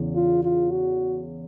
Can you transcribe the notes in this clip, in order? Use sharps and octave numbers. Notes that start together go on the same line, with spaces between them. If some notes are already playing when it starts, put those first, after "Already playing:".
Already playing: E2 C#3 E3
F4
F4
F#4